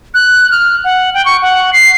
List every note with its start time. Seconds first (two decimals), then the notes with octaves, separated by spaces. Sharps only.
0.14 F#6
0.51 F6
0.84 F#5
1.14 G5
1.25 C#6
1.42 F#5
1.73 C7